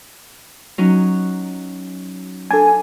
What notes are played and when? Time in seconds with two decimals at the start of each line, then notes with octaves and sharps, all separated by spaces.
0.78 F#3 C#4 D#4
2.51 D4 A4 G#5